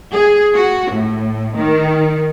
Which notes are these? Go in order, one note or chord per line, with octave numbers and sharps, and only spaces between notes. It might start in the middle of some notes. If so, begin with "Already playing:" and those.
G#4
F#4
A2
D#3